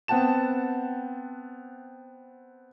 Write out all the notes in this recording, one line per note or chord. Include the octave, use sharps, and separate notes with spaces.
B3 C4 F#5 G5 A5 E7